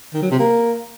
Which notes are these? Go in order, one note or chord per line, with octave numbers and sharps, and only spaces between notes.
D#3
F#3
C3
A#3